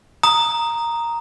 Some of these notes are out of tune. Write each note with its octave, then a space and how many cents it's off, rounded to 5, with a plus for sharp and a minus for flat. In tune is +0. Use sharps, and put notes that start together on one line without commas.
A#5 +0 D#6 +0